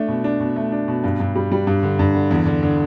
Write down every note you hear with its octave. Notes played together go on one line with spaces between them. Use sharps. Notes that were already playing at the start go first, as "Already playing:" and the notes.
Already playing: A3 D4
B2
D4
B2
A3
D4
B2
G2
G2
G3
G3
G2
D3
G2
D3
E2
D3
D3